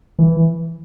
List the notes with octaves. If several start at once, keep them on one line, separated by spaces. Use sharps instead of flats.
E3